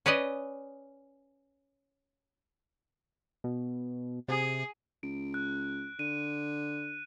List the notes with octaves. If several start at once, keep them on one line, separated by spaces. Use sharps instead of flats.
C#4 B4 D5 D#5
B2
C3 G#4
C#2 D7
F#6
D3 D#7